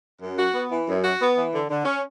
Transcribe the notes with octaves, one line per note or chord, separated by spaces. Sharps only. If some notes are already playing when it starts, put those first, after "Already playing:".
F#2
F#4
B3
E3
F#2
F#4
B3
E3
D3
D3
C#4